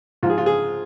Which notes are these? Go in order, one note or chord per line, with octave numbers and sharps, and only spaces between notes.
G#2 F3 F4
G#4
F4
G#4